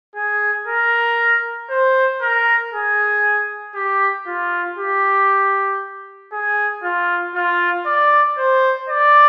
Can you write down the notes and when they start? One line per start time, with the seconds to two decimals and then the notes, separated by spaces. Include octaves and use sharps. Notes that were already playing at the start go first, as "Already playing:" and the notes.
0.15 G#4
0.67 A#4
1.70 C5
2.21 A#4
2.72 G#4
3.75 G4
4.27 F4
4.78 G4
6.32 G#4
6.83 F4
7.35 F4
7.86 D5
8.38 C5
8.89 D5